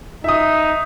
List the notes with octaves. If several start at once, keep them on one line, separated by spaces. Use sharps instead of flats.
D#4 E5 D#6